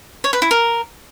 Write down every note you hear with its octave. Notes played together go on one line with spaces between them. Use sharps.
C#5
B4
E4
A#4